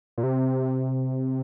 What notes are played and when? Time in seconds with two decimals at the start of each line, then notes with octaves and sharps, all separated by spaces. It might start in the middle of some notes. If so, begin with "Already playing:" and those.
0.18 A#2
0.23 C3